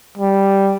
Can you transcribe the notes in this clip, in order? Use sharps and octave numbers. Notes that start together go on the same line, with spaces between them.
G3